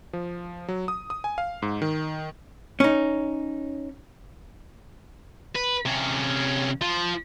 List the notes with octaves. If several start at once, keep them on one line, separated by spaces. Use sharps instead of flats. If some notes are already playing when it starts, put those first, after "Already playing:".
F3
F#3
D#6
D#6
G#5
F5
G#2
D#3
C#4 D#4
B4
C3 C#4
F3